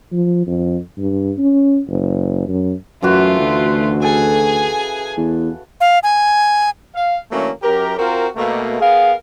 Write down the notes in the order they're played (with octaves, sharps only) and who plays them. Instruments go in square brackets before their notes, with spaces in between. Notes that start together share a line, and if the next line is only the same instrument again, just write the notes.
[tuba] F3
F2
G2
C#4
F#1
F#2
[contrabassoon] F#2 [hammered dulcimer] C#3 E3 F#4 [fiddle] A3 F4
[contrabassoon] D2
[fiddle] G#4 G#5 [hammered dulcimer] A4
[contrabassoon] E2
[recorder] F5
G#5
[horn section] F5
D3 E3 F#3 A3 A#3 C#4
F#2 G4 A#4
C4 F4 F#4 A#4
B2 A3 A#3
B3 G#4 A#4 F5